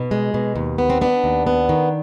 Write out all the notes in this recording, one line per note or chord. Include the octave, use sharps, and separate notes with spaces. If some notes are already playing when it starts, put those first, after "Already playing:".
Already playing: B2 D#4
G#3
B2
D#2
B3
C4
B3 D4
D#2
B3
D#3